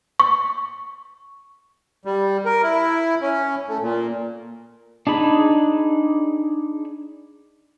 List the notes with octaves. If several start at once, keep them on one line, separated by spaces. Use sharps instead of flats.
C#6
G3
A#4
E4
C#4
A3
A#2
D4 D#4 G#4 B5